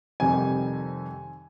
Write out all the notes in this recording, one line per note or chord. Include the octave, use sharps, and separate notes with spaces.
F2 C3 D#3 G3 G#5